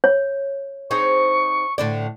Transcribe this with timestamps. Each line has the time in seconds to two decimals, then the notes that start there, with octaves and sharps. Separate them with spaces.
0.04 C#5
0.91 C4 D#4 G#4 C#6
1.78 A2 D3 D5